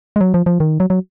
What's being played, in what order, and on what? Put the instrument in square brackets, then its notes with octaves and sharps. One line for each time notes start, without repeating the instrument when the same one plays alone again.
[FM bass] G#3
F#3
F3
F3
D#3
F#3
F#3